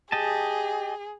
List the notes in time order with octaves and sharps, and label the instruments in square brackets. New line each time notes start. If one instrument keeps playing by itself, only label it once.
[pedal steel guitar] G4 D#5 A5 [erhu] G#4